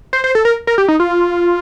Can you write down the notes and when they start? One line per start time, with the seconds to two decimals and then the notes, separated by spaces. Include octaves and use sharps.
0.13 C5
0.24 C5
0.35 A4
0.45 A#4
0.67 A#4
0.78 G4
0.88 D#4
1.00 F4